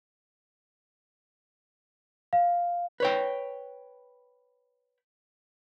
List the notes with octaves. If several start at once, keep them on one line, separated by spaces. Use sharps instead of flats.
F5
B4 C#5 G5